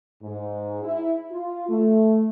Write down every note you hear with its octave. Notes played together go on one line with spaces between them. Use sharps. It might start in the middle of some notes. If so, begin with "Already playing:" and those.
G#2
E4
F4
A3